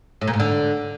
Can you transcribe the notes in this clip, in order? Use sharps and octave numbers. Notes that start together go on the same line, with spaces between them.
A2
A#2
G#2
D3